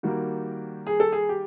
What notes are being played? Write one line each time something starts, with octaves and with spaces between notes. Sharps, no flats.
D#3 G3 A#3 F#4
G#4
A4
G#4
G4